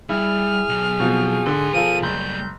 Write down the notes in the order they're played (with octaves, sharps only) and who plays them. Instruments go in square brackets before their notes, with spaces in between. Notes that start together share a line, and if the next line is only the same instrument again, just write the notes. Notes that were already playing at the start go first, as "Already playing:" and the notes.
[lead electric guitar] G3 [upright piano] E4 [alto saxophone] G#4 [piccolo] F6
[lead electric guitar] B1
[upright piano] B2 F3 C4
[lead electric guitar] G#2 C6 [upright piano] D3
[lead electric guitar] B2 A#4 [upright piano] F3 F4 A4 [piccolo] D#7
[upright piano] F#1 [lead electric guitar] G3 A3 [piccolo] G6